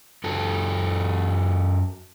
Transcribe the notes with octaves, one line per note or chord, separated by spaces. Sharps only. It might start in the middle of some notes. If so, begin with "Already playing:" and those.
F#2 F#4 A4